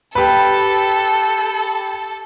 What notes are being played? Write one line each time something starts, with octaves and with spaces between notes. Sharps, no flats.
G4 A4 B4